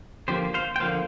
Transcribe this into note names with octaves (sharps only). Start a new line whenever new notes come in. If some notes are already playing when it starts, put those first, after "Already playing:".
D3 F3 A#3 G4 C5
C5 F5
G5
D3 F3 A#3 C5 F5